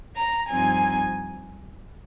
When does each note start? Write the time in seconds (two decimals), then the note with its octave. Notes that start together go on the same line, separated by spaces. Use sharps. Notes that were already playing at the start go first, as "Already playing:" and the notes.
0.15 A#5
0.48 G2 F3 C4 D#4 G#5